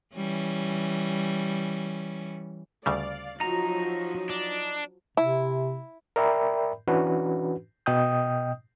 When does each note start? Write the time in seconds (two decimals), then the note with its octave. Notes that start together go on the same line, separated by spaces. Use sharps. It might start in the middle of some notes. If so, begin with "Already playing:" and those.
0.16 E3 G3 C#4
2.86 D2 C#3 G3 D5 F5
3.40 F3 F#3 D#4 A#5
4.30 D4
5.17 C3 E4
6.16 A#4 D5 E5 G5 B5
6.87 E3 C#4 D4 F#4 B4
7.86 B2 D#5 G5 D#6 G6